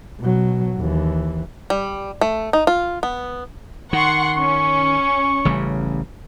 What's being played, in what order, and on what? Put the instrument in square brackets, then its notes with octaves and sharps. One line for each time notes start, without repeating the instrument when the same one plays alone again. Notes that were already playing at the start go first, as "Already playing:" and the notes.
[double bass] B2 F#3
D#2 E3
[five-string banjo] G3
A3
D#4
F4
B3
[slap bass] D#3 [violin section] F#5 C6 C#6
[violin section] C#4 [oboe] C#6
[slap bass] A1 C#3 G3